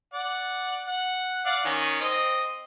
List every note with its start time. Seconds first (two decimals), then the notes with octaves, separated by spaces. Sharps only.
0.14 D5 F#5
0.87 F#5
1.46 D5 F5 F#5
1.65 D#3 C#4
2.00 C4 D#5